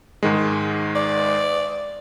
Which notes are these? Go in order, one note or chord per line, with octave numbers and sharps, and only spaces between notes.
G#2 D#3 G#3
D5